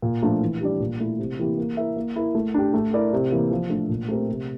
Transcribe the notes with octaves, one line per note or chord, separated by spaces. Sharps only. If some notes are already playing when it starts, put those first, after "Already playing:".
A#2
F3 A3 D4 F4
E3
G3 D4 G4 D5
A#2
A3 E4
C3
E3 A#3 E4 G4
A#3
E4 A#4 E5
A#3
E4 A#4
A3
D4 G4
A3
E4 A#4 D5
C3
E3 A#3
F3
A3 D4
A#2
A3 C4 G4 A#4
C3